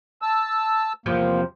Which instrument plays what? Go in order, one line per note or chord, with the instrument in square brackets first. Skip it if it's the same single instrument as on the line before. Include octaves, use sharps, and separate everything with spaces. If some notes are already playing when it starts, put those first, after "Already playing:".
[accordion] A5 E6
[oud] E2 C3 F3 [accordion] A#3